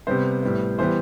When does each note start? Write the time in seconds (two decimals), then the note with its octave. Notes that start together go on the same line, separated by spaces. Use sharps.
0.07 C3 G3 B3 C5
0.43 A2 G3 B3
0.79 E3 G3 B3 C5